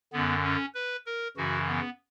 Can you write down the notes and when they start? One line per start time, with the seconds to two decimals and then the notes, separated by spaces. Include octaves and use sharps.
0.12 F#2 D3 B3
0.44 C#4
0.75 B4
1.06 A#4
1.37 F#2 C#3 E3 F#4
1.68 B3